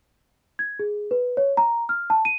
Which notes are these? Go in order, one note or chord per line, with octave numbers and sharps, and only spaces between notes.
G#6
G#4
B4
C#5
A#5
F6
A5
D#7